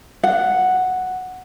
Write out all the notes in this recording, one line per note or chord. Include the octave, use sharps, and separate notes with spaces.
F#5